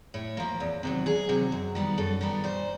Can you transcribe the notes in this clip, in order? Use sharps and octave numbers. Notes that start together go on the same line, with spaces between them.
A2 C#5
F3 A#3
E2
C3 D#3 F#3
E2 G#4
C3 D#3 F#3
F#2
D#3 G3 B3
F#2 A4
D#3 G3 B3
A#2 C5